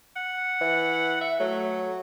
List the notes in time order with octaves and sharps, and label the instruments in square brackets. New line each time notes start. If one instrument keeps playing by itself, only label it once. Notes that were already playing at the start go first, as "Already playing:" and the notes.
[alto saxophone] F#5
[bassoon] E3
[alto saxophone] E5
[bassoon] F#3 [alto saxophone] A3